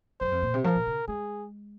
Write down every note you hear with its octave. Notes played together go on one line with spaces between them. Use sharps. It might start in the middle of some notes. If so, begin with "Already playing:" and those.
F#2 C5
F2
A#2
C3
F3 A#4
A#2
C#3
G#3 G#4